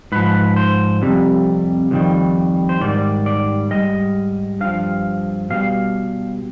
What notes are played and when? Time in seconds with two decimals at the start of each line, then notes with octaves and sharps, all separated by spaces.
0.12 G#2 F3 B4
0.56 C5
1.02 F2 C3 G3
1.91 F2 D#3 G3
2.69 C5
2.81 G#2 D#3 G3 D5
3.26 D5
3.71 G#2 G3 D#5
4.61 G2 F3 F5
5.50 B2 G3 F5